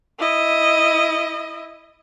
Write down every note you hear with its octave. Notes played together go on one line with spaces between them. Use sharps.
E4 D#5